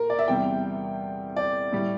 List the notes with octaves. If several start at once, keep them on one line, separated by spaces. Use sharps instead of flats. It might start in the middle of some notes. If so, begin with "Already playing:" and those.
Already playing: A#2 A#4
D5
E5
E2 C3 G3 G5
D5
A2 G3